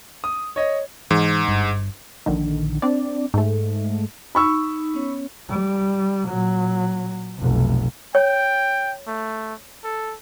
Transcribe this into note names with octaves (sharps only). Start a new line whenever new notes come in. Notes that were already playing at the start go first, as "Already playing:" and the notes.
D#6
C#5 D#5
G#2 E3
G1 G2
A#1 D3 D#3
C4 D4 D5
G#2 A3
D#4 B5 C#6 E6
B3 C#4 C#5
G3
A#2 F#3
F1 B1
C#5 G5
A3
A4